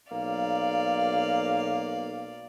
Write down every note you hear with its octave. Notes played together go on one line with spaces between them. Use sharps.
B1 A#3 D5 F5